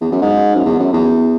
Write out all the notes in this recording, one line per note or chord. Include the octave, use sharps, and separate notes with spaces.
E2
F#2
G#2
F#2
E2
F#2
E2